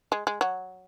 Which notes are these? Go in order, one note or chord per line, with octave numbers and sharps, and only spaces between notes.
G#3
G#3
F#3